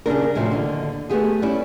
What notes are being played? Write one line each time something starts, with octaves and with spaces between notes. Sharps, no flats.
C#3 G3 D4 A#4
E2 A2 C3 F3 F#3
D#2 D3
A3 B3 G4 G#4
G3 C#4 E4